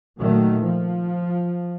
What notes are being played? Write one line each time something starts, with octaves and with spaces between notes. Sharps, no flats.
A#2 D#3 F#3 A3
F3